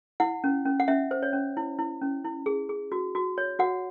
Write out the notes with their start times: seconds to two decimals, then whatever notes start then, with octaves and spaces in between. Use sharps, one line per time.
0.20 E4 F#5
0.44 C#4
0.65 C#4
0.80 F#5
0.88 C#4 E5
1.11 C5
1.23 C#5
1.33 C#4
1.57 E4
1.79 E4
2.02 C#4
2.25 E4
2.46 G#4
2.69 G#4
2.92 F#4
3.15 F#4
3.38 C#5
3.59 F#4 F#5